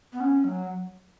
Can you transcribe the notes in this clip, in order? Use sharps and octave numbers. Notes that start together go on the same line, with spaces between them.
B3
C#4
F#3